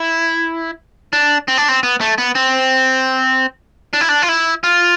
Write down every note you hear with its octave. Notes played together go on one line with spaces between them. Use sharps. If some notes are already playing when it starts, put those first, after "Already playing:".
Already playing: E4
D4
C4
D4
C4
B3
A3
B3
C4
D4
E4
D4
F4
E4
F4